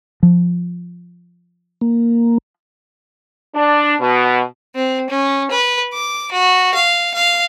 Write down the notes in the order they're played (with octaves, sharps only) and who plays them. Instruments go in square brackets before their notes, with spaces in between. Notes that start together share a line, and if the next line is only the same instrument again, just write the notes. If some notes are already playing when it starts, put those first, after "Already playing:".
[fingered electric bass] F3
[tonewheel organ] A#3
[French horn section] D4
B2
[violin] C4
C#4
B4
D6
F#4
F5
F5